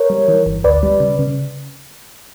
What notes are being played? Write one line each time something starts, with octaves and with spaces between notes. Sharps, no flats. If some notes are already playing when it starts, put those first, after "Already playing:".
Already playing: A#4 C#5
G3
E3
G1
D2 B4 D5
G3
C#3
C#3